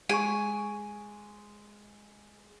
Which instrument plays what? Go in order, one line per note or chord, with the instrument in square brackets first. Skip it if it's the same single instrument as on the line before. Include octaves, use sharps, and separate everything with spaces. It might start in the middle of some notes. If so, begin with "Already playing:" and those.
[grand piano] G#3 [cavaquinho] G#5 [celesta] C#6 D7